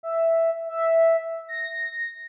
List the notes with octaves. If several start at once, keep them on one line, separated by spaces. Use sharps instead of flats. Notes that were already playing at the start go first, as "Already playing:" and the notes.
E5
E5
A#6